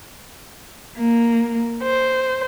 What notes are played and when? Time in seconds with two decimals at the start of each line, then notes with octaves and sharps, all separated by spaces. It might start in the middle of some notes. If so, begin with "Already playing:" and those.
0.97 A#3
1.81 C5